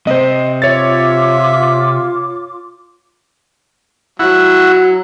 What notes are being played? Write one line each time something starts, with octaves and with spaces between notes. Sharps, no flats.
C3 C5 D#5
F4 C#5 E5 D6 A6
F#3 E4 F#4